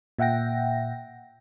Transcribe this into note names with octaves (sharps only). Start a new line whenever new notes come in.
A#2 E5 F#5 G5 A#6